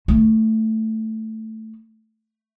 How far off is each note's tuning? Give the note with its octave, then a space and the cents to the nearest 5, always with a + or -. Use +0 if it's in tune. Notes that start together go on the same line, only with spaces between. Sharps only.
A3 +5 D#4 +25